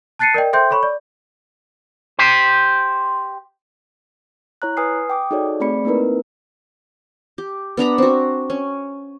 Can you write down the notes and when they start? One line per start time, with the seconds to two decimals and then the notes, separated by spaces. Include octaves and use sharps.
0.19 A5 F#6 A6 C7 C#7 D#7
0.34 A#4 D5 D#5 G5
0.53 A4 C5 E5 G5 C6 G6
0.71 A4 C#5 B5 C#6
0.83 D5
2.19 G4 C5
4.62 E4 C#5 A#5 F#6
4.77 B4 G#5 D#6 F6 C7
5.10 G5 D6 D#6
5.31 D#4 F#4 G#4 A4 C#5 D5
5.60 A3 C4 G#4 D5 B5 C#7
5.85 A#3 C4 D#4 E4 A#4 B4
7.38 G4
7.77 B3 D4 A#5 B5
7.98 C4 F#4
8.50 C#4